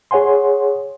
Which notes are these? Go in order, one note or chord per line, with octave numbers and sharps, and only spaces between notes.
G#4 C#5 F#5 G#5 C6